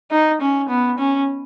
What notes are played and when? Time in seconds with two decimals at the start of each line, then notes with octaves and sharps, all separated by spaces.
0.11 D#4
0.41 C#4
0.69 B3
0.99 C#4